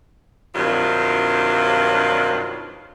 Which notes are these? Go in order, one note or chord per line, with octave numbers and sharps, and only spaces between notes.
G2 C3 D#3 F#3 D4 F4